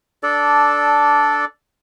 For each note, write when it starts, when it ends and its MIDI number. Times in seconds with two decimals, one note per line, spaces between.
0.23 1.45 62
0.23 1.45 69
0.23 1.45 74